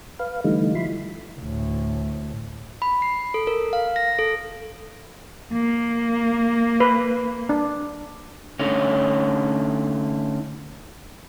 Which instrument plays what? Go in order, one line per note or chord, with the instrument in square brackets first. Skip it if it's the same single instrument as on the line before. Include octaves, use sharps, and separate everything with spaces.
[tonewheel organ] B4 F5
D3 E3 G3 A3 D#4
F3 E4 B5 C6
[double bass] D2 A2
[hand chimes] B5
C7
A4
A#4
F5
A#6
A4
[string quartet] A#3
[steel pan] B4
D4
[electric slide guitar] D3 A3 C#4 D#4 C#5